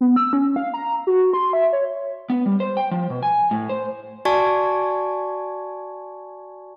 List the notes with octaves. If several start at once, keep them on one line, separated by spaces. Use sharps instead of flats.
B3
E6
C#4
F5
A#5
F#4
C6
E5
C#5
B3
G3
C5
G5
F3
B2
G#5
A2
C5
F#4 D5 G#5 A5 C#6 G#6